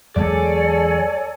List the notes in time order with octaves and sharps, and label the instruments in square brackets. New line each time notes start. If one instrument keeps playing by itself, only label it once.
[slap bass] E2 F#3 G#3 [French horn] G#4 [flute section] A4 C#5 G#5 [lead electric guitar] D5